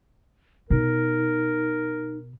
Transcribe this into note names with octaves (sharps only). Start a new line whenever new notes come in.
B2 D#4 A#4